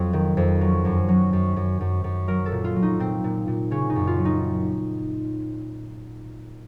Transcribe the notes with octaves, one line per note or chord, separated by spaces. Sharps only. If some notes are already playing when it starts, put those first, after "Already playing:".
Already playing: F2 F#3 C4
D#3
F2
F#3
F#2
F#3
F#2
F#2
F#2
F#2
F#3 A#4
A4
A#2
F4
F#3
D#4
A#2 C4
A#2
A#2
C#3 C#4
D#4
F#2
F4
F#3
D#4